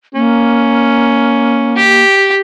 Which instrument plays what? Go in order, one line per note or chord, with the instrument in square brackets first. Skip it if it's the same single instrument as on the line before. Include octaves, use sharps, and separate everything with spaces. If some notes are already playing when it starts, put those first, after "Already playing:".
[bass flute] A#3 [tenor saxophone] C#4
[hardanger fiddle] G4